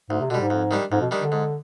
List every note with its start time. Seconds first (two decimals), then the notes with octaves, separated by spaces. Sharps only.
0.10 D2 G#2
0.21 C3
0.30 B2 D3
0.34 G3
0.40 G#2
0.50 F2
0.71 D#3 G3 D4
0.92 F2 G#2
1.02 B2
1.11 D#3 G3 D4
1.21 D3
1.32 G#2